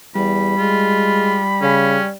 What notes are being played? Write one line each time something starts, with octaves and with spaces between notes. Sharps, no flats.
E2 G3 B5
G#3 F4
C#3 C#4